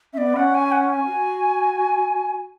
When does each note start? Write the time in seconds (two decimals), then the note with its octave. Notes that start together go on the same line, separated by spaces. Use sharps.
0.13 C#4 E5
0.18 B3 D5
0.36 C#4 F#5
0.55 G#5
0.72 F#5
0.90 G#5
1.07 F#4